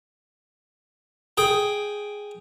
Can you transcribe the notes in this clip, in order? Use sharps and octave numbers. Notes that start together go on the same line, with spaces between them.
G#4 G5